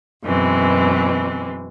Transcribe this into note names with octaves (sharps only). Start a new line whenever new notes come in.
F#2 B2 E3 G#3 C4